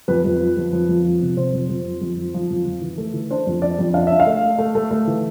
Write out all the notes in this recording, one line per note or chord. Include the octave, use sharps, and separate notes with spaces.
F2 B4
F2
F3
F2
F3
F2
F3
C3
C3 C5
F2
F2
F3
F2
F3
F3
F2
F2
E3
A3
E3
D4 C5
F2
D4 D5
F2
D4 F5
D4 E5
F5
A3
A3
A3
A3
A3
E3